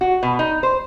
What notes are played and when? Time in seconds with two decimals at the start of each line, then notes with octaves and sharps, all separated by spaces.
0.01 F#4
0.23 B2
0.39 D#4
0.63 C5